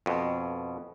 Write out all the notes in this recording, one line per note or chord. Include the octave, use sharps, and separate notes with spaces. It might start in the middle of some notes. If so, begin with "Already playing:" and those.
F2 B2